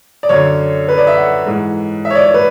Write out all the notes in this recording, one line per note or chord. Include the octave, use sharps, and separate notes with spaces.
D5
F#2 D3 C#5
B4
D5
E5
F#5
G#2 E3
E5
C#5
D5
C#5
B4